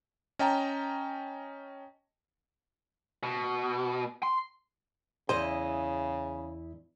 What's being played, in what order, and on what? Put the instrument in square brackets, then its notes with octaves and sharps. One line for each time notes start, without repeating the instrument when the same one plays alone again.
[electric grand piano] C#4 D#5 G5 A5 A#5
[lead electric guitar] B2
C6
[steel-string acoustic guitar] E2 E4 D#5 [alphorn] C#3 [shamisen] C5